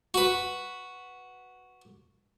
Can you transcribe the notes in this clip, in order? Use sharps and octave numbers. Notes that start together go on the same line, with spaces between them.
F#4 B4